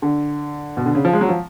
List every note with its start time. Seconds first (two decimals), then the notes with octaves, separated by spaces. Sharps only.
0.02 D3
0.77 B2
0.86 D3
0.95 C#3
1.05 F3
1.13 G#3
1.21 F#3
1.29 F3